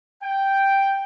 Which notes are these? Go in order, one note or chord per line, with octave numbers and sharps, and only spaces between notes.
G5